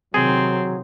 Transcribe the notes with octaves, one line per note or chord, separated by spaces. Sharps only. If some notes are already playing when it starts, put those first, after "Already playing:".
C3 D#3 F#3 C4 G#4